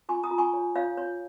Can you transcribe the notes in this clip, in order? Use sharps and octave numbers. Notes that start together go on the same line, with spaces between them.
F4 G#5 C#6
A#5 D#6
F4
G#5 C#6
C#5
F4 C#5 F5
C#5